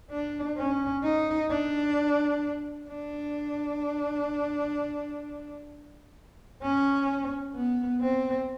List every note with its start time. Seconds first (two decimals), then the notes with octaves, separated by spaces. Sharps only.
0.11 D4
0.57 C#4
1.04 D#4
1.50 D4
2.90 D4
6.62 C#4
7.55 B3
8.02 C4